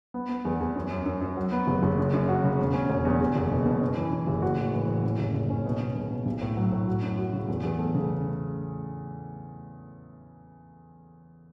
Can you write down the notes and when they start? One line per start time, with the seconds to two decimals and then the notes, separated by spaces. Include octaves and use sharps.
0.14 B3
0.29 B3
0.45 E2
0.60 E2
0.75 F#2
0.91 F#2
1.06 F#2
1.21 F#2
1.37 F#3
1.52 B3
1.67 F#1
1.83 F#1
1.98 F#2
2.13 F#2
2.28 F#4
2.44 C#3
2.59 E1
2.74 C#4
2.90 E1
3.05 E2
3.20 E2
3.36 F#1
3.51 B2
3.66 B2
3.81 F#2
3.97 E3
4.12 F#2
4.27 F#1
4.42 F#4
4.58 A2
4.73 E3
4.88 A2
5.04 C#4
5.19 F#1
5.34 F#1
5.50 C#4
5.65 B2
5.80 B2
5.95 C#2
6.10 B2
6.26 B1
6.41 A2
6.57 F#3
6.72 A2
6.87 F#4
7.02 F#2
7.17 F#4
7.33 C#3
7.48 E2
7.63 E2
7.79 A3
7.95 C#3